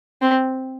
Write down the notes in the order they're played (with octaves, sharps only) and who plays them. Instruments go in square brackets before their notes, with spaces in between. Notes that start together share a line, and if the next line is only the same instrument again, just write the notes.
[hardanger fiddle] C4